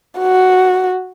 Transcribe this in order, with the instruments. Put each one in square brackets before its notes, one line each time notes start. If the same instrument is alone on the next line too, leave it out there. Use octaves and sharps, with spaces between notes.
[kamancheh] F#4